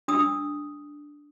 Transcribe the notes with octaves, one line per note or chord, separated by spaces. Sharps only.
D4 D#6 E6